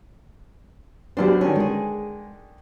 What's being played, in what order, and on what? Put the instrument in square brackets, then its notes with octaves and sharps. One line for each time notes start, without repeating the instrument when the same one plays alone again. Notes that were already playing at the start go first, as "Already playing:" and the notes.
[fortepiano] B1 F#2 D4 [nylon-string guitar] G4 B4 C5
[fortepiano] D3 D#3 [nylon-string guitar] C#4
[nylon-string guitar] G#3 G#4